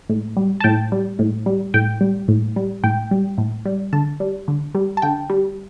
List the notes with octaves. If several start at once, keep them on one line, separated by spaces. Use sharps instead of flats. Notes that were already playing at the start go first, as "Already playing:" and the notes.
A2
G3
A5
A2 G5
G3
A2
G3
A2 G5
G3
A2
G3
A2 G5
G3
A2
G3
D3 A5
G3
D3
G3
A5
D3 G5
G3